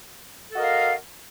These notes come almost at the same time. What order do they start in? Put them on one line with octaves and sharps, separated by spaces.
A4 F#4 D#5 A#4 F5